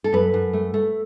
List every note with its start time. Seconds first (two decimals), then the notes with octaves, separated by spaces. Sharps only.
0.04 A4
0.12 F#2 B4
0.34 F#2
0.53 A3
0.74 A3